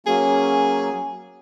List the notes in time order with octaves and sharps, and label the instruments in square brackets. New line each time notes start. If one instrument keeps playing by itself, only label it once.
[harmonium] F#3 A#3 C#4 [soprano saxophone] G#4